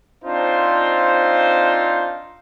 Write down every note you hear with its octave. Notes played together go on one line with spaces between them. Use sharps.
C4 D4 D#4 F4 C5